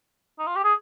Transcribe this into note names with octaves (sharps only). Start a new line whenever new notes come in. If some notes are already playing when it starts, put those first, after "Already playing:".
D#4
F4
G4
G#4